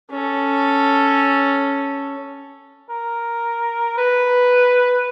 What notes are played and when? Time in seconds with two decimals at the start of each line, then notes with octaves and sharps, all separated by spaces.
0.11 C#4 A4
2.89 A#4
3.98 B4